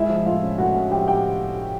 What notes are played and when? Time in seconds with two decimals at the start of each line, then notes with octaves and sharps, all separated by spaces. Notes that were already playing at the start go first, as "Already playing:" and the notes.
Already playing: G#3 E4 E5
0.09 F3
0.26 A2 F4 F5
0.42 C#4
0.58 A2 F#4 F#5
0.74 C#4
0.91 F3 G4 G5
1.08 A2 G4 G5